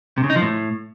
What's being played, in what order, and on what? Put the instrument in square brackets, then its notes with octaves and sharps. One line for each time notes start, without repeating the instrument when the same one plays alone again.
[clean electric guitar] C3
C#3
D#4
F3
A2